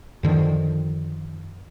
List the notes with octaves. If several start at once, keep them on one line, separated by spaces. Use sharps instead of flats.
F#2 D3 D#3 F3